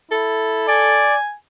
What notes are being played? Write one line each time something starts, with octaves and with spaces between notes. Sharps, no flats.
E4 A4
D5 G#5